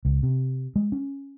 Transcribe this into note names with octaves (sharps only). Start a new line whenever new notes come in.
C#2
C3
G#3
C#4